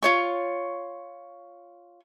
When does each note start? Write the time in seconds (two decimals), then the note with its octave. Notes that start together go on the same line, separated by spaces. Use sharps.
0.03 F4 C#5 C#6